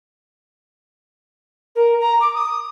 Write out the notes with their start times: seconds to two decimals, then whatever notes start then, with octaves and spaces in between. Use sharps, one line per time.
1.75 A#4
2.00 A#5
2.20 D6
2.34 D#6